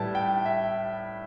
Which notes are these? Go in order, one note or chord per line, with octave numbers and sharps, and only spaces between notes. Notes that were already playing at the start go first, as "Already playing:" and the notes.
Already playing: A2 G3 B4 A5
G5
E5